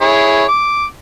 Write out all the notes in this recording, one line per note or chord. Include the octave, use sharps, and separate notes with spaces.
E4 G#4 C#5
D6